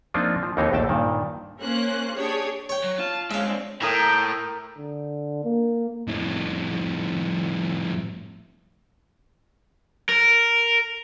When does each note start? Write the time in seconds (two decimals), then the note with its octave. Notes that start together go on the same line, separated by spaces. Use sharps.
0.14 F3 A#3 C4 D4 D#4 F4
0.43 F3
0.57 D#2 E3 C4 D#4 A4 C#5
0.71 A#1 D#2 A3 G5 A5
0.89 G2 A#2 D#3
1.62 A#3 C#4 C5 F#6
2.15 D4 G4 G#4 C#5
2.69 C#5 G5
2.84 F#3
2.99 F4 A5
3.31 G#2 G#3 C#4 E5 F5
3.45 C4 D4
3.82 A2 E4 A#4 G5 D#6
4.78 D3
5.44 A#3
6.08 F2 A2
10.09 A#4